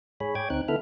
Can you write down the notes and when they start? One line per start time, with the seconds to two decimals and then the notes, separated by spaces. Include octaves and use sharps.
0.20 G#2 G#4 C#5 B5
0.35 C#5 G5 D6 G#6
0.50 D2 C4 D#4 F#6
0.68 D3 B3 E4 A4 E5 F6